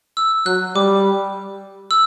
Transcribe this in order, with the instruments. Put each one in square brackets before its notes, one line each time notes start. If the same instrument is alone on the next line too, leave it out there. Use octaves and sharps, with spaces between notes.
[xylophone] E6
[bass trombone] F#3 [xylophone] F#6
[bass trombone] G3 [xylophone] D6
[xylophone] E6